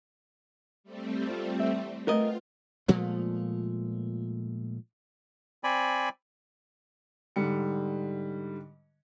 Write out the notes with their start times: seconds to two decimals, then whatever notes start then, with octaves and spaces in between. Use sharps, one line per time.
0.84 G3 A3 C4
1.29 F4
1.59 E2 E5
2.08 A3 B3 C4 F4 A#4 D#5
2.88 A#2 F3 G#3 A3
5.64 C4 D5 G#5 B5
7.36 G#2 D3 G3 C#7